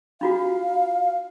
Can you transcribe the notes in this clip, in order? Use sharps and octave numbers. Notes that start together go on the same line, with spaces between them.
D4 F4 F#4 F5